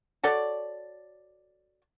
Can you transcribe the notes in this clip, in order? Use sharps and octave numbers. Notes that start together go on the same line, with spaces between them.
F#4 A4 C#5 D5